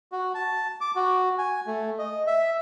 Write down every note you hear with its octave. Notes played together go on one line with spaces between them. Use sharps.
F#4
A5
D6
F#4
G#5
A3
D#5
E5